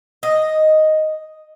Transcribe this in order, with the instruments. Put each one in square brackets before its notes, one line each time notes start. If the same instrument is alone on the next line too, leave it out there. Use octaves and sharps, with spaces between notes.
[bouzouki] D#5